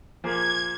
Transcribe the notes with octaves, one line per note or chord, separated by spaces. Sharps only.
A#2 F3 A#3 G#4 G#6